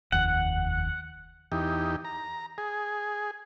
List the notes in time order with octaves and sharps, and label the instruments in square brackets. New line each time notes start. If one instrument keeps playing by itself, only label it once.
[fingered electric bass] F1 D#2 [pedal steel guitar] F#5
[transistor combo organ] E2 D#4 G4
A#5
G#4